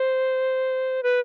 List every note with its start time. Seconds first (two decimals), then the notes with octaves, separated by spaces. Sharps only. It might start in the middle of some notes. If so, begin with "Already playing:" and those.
Already playing: C5
1.03 B4